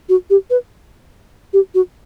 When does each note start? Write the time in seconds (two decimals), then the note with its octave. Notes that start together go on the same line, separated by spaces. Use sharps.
0.09 F#4
0.30 G4
0.50 B4
1.53 G4
1.75 F#4